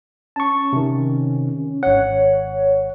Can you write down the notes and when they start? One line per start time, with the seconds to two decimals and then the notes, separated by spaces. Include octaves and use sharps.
0.36 C#4 A5 C#6
0.73 C3 D#3
1.83 G#1 C#5 F#5